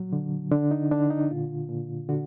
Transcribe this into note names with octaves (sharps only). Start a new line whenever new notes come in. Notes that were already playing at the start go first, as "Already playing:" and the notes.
Already playing: A#2 F#3
D3
D3 D4
D#4
D3 D4
D#4
A#2 F4
A#2
D3 F#4